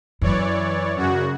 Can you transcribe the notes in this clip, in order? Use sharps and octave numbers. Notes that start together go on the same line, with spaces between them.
F#2 E3 C#5 D5
F#2 C#3 F#4